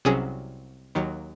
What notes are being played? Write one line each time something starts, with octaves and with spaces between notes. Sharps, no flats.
C2 C3 F#3 C#4 G#4
D#2 D#3 F#3